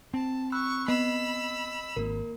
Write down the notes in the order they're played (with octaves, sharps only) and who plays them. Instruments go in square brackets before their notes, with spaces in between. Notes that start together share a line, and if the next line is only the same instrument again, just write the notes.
[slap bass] C4 [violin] A5
[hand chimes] B5 E6 F#6 [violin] C#6
[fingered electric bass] B3 [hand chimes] D#5 C7 [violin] B5 E6
[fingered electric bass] G#1 [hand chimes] A#3 A#4